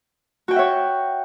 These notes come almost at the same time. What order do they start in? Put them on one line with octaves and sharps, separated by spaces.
F#4 G5 F#5 E5 C#5